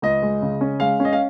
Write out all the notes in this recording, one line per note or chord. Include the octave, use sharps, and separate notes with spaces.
C#2 D#5
G#3
C#3
C#4
G#3 F5
C#4
D#5
F5